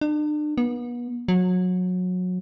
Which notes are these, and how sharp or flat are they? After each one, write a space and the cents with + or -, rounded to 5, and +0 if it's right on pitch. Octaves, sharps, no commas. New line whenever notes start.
D4 +40
B3 -35
F#3 -25